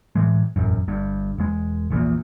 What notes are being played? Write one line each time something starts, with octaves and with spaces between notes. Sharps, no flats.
A2 E3 G#3
E1 A1 F#2
G1 G2
E1 G#3
E1 A#1 E2 A#2